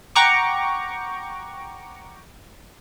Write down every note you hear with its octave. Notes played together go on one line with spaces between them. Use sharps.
F#5 G5 A#5 C#6 D6